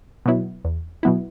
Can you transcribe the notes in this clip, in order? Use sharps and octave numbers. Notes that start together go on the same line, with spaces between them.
B2 F#3 B3 E4
E2
B2 F#3 B3 E4